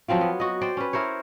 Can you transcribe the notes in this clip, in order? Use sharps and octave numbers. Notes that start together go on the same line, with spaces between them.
F3 F#3 C4 F4
B3
F#4 D#5
C5 D5 G5
C#4 B4
E4 A#4 C5 C#5